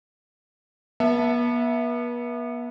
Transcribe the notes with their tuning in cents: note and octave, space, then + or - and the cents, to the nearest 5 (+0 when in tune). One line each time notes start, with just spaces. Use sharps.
B3 -40 E5 +0 A5 +0